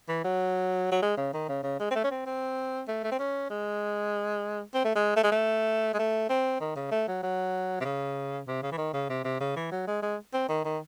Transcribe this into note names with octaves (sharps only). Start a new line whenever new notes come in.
E3
F#3
F#3
G#3
C#3
D#3
C#3
C#3
G#3
C4
A3
C#4
C4
C4
A3
A3
C4
C#4
G#3
C4
A3
G#3
A3
G#3
A3
G#3
A3
C4
D#3
C#3
A3
F#3
F#3
C3
C#3
C3
C#3
E3
D#3
C#3
C3
C3
C#3
E3
F#3
G#3
G#3
C4
D#3
D#3